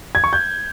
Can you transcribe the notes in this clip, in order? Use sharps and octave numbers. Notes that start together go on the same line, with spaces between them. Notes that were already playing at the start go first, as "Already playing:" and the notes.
G#6
C#6
G6